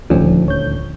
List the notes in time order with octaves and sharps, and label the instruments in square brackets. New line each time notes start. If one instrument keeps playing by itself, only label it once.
[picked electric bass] D#1 D2 [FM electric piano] F3 C#4
[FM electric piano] C#5 G6